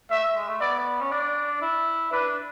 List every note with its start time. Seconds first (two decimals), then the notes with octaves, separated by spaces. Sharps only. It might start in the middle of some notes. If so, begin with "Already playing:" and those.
0.10 A3 E5
0.36 G#3
0.48 A3
0.61 B3 D5
1.00 C#4
1.11 D4 D5
1.62 E4
2.12 D4 B4